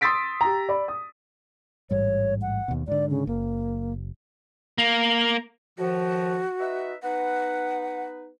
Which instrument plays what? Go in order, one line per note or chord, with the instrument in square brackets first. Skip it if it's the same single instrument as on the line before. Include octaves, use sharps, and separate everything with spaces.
[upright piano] C6 D#6 E6 A6 B6 D7
G4 A#5
D5 B5
D#6
[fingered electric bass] A1 G#2 G3 [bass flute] C#5
[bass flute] F#5
[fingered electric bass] D#2 B2
[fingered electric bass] G#2 D3 [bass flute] D5
[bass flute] C#3
[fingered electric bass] F#1 [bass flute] A#3
[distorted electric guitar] A#3
[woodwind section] A2 D#3 F3 [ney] F#4
[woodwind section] D#4 B4 E5
[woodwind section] B3 D#4 B4 [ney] F#5